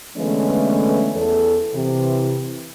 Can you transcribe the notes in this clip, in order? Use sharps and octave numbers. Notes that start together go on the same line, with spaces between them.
D3 E3 G#3 A3 B3 C#4
E2 A4
C3 E3